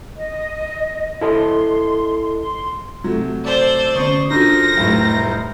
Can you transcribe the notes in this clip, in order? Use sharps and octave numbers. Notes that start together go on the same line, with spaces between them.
D#5
E4 A4 D#5 C6
C6
C3 F#3 A3
A4 C5 D5 E6
D3 B3 C#4 C6 C#6 D#6
D3 F3 D4 D#4 F#4 A#4 C5 A#6
F1 A2 F#3
G3